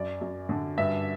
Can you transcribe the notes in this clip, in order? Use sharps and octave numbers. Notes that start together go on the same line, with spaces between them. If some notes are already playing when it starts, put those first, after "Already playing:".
Already playing: F#2 D5
F#2
D3
G2 E5